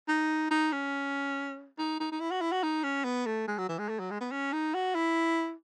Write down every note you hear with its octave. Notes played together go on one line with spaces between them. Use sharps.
D#4
D#4
C#4
D#4
D#4
D#4
E4
F#4
E4
F#4
D#4
C#4
B3
A3
G#3
F#3
E3
G#3
A3
F#3
G#3
B3
C#4
D#4
F#4
E4